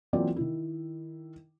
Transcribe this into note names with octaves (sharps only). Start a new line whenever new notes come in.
E3 F#3 A#3 C4 F4 D5
D#3 E4